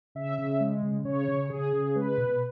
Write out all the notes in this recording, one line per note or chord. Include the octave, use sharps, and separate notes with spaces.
C#3 E5
C#3
G#3
C#3
C#3 C#5
C#3
C#3 G#4
C#3
G#3 B4
B2